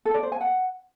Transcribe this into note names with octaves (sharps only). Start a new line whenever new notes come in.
A4
D5
C5
G#5
F#5